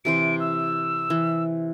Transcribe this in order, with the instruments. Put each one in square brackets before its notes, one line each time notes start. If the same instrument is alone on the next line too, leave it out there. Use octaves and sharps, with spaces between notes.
[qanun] C3 E3 C5 [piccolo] D7
[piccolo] E6
[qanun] E3